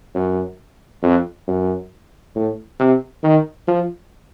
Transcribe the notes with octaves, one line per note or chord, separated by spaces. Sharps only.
F#2
F2
F#2
A2
C3
D#3
F3